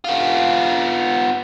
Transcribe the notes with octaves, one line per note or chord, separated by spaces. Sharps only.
B3 F4